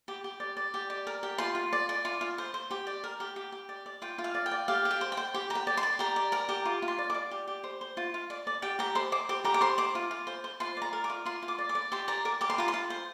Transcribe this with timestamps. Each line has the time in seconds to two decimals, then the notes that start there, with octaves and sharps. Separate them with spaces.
0.08 G4
0.24 G4
0.40 D5
0.57 D5
0.74 G4
0.90 D5
1.07 A#4
1.23 G4
1.38 F4 C6
1.55 F4
1.73 D5
1.89 D5
2.05 F4
2.21 F4
2.38 C5
2.54 C5
2.71 G4
2.87 D5
3.04 A#4
3.20 G4
3.36 G4
3.52 G4
3.69 D5
3.86 D5
4.02 F4 G5
4.18 F4
4.24 F5
4.35 D5
4.46 G5
4.51 D5
4.68 G4 F5
4.85 G4
4.91 G5
5.01 C5
5.12 G5
5.17 C5
5.34 G4
5.50 G4 A#5
5.55 G5
5.67 D5
5.77 C6
5.83 D5
5.99 G4 A#5
6.16 D5
6.32 A#4 A#5
6.49 G4
6.65 F4 D6
6.82 F4
6.88 C6
6.98 D5
7.10 D5 D6
7.31 G4
7.47 G4
7.64 C5
7.81 C5
7.97 F4
8.14 F4
8.30 D5
8.47 D5
8.62 G4 G5
8.79 G4 A#5
8.95 C5 C6
9.12 C5 D6
9.29 G4 D6
9.44 G4 A#5
9.54 D6
9.61 C5 C6
9.78 C5 D6
9.95 F4
10.11 F4
10.27 C5
10.44 C5
10.60 F4 C6
10.77 D5 A#5
10.93 A#4
11.04 D6
11.10 F4
11.26 F4 C6
11.42 F4
11.48 D6
11.58 D5
11.69 D6
11.75 D5
11.92 G4 C6
12.08 D5 A#5
12.25 A#4 D6
12.41 G4 D6
12.50 C6
12.58 F4 A#5
12.68 C6
12.74 F4
12.90 C5